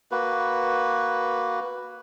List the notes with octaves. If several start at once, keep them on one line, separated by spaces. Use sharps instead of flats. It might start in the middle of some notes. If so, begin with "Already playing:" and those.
A#3 F#4 B4